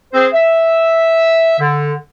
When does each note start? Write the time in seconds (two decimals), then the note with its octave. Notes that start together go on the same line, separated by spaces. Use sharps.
0.13 C4 G#4 C5
0.33 E5
1.59 D3